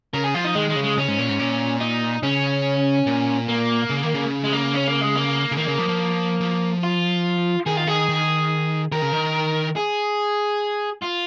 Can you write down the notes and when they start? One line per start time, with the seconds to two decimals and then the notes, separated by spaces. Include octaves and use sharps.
0.14 C#3 A#4
0.24 G#4
0.35 F3 F4
0.45 D#4
0.55 D#3 G#3
0.69 G#3
0.76 C#3
0.83 G#3
0.97 C#3 C#4
1.08 G#2
1.19 A#2
1.29 G#2
1.39 A#2
1.81 D#4
2.23 C#3 C#4
3.07 A#2
3.48 A#3
3.90 C#3
4.03 D#3
4.14 C#3
4.44 G#3
4.53 A#3
4.74 C#4
4.88 A#3
5.02 G#3
5.16 A#3
5.52 C#3
5.57 D#3 A#3
5.68 C#3
5.78 F3
5.89 F3
6.41 F3
6.83 F4
7.66 D#3 G#4
7.77 F4
7.87 D#3 G#4
8.09 D#3
8.92 D#3 A#4
9.02 C#3
9.13 D#3
9.76 G#4
11.02 F4